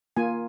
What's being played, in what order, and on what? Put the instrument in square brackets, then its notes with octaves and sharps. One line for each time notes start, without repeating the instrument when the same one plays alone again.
[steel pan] A#3 F4 G#5